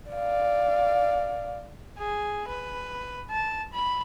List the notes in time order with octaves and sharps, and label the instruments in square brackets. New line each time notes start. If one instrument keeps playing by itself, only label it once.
[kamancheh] D5 F5
[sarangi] G#4
B4
A5
B5